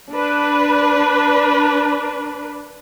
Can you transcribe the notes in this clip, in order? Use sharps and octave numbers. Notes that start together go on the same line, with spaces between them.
D4 B4